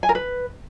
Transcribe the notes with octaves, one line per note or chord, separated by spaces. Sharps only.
G#5
A#4
B4